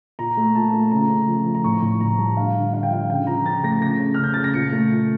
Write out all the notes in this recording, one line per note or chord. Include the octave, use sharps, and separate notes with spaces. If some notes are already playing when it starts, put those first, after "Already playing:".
A#2 A#5
A3
A#2 A5
A3
C#3 A#5
C#3
F3
F3
A#5
A2 C#6
A2 C#6
A2 A#5
G3 A5
D3 F5
D3
D3 F5
G5
F3 F5
C#3 G5
F3 A#5
C#3 A6
A3 A#6
C#3 A#6
C#3
C#3 F6
G6
C#3 A6
A#6
A#2 C#7
A3
A#2